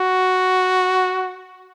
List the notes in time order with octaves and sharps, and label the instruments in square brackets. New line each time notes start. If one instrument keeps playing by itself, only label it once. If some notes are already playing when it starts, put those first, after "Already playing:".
Already playing: [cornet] F#4